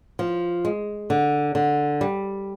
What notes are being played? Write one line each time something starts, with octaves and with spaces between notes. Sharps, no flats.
F3
G#3
D3
D3
G3